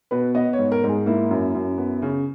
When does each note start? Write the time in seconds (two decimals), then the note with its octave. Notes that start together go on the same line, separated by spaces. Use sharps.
0.11 B2 B4
0.35 B3 D#5
0.53 C#5
0.59 G#2
0.72 A#4
0.83 G#2
0.89 G#4
1.06 A#3 E4
1.31 F#2
1.55 F#2
1.78 B3
2.02 C#3